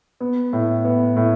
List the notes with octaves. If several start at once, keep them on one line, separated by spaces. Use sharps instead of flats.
B3
A2
B3
A2